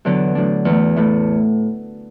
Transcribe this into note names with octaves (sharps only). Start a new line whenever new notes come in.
E2 D3 F#3 B3
A2 F#3 D4
E2 E3 A3
A2 E3 A3